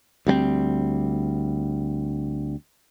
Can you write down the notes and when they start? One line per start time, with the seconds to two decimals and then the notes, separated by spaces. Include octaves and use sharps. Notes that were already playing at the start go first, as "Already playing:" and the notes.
0.27 D2 G3 A#3 C4